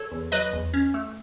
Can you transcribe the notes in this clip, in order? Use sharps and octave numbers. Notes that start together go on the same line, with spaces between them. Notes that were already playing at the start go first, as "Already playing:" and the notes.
Already playing: A4 C#5
E2
F#3 B4 D#5
E2
C#4
A3